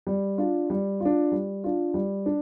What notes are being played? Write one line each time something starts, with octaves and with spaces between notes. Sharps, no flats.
G3
D4 F4
G3
D4 F4
G3
D4 F4
G3
D4